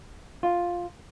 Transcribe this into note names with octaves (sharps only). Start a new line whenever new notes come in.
F4